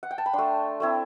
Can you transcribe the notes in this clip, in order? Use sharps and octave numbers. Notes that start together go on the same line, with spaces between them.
F#5
G5
A5
B5
A3 D4 C6
A3 C4 E4